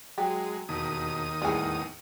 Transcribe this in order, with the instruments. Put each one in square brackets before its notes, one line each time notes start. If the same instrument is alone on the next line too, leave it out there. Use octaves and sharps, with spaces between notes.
[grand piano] F#3 [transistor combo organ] G#3 [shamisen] G4
[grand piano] E1 [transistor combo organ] D#2 D#6
[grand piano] E2 A2 [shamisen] G3 G#4